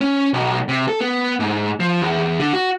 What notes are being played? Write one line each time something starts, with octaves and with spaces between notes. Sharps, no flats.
C#4
B1
C3
A4
B3
G#2
F3
E2
D3
F#4